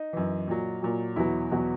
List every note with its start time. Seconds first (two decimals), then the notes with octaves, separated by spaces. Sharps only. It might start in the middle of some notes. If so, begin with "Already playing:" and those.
Already playing: D#4
0.13 F#2 E3
0.48 A#2 F#3
0.82 A#2 F#3
1.16 E2 B2 F#3 E4
1.51 E2 B2 F#3